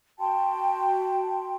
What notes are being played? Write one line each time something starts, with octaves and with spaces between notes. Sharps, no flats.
F#4 G5 A5 C6